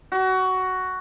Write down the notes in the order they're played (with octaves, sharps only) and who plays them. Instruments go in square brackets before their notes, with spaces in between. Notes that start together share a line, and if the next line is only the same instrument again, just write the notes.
[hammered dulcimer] F#4